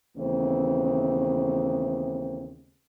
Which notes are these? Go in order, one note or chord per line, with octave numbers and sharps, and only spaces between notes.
D#2 C#3 E3 A3 B3 C4